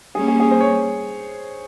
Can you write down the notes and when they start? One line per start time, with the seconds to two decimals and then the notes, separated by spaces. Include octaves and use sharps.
0.15 G3 A#3 C#4 G#4
0.28 G#4
0.40 G#4
0.51 C5
0.61 C#5